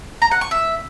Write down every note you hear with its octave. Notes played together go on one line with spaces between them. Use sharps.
A#5
F#5
C#6
E5